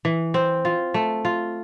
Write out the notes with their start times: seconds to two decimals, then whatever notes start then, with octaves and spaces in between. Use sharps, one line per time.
0.05 E3
0.34 C4
0.65 F4
0.94 A3
1.25 F4